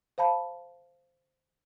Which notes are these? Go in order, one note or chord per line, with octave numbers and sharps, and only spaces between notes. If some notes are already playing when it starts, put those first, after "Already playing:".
C5 F5 A5 B5